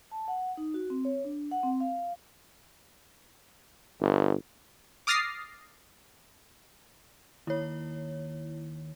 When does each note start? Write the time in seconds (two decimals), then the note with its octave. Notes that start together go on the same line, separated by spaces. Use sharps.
0.11 A5
0.28 F#5
0.57 D#4
0.74 F#4
0.90 C4
1.05 C#5
1.25 D4
1.51 F#5
1.63 C4
1.80 F5
4.00 G1
5.07 D6 D#6 F6 A6 A#6 C7
7.47 D#2 E4 C#5